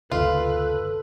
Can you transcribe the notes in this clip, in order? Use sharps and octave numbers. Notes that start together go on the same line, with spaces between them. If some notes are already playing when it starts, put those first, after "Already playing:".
F#1 D2 C3 F4 A4 B4